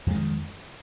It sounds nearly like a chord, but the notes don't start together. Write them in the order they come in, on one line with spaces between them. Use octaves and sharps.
F2 G#3 D#3